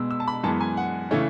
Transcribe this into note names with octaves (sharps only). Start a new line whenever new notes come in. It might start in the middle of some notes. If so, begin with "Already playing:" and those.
Already playing: B2 G#3 B3 E6
E6
A5
B5
F#2 E3 G#3 B3 A5
G#5
F#5
C#3 E3 A3 C#4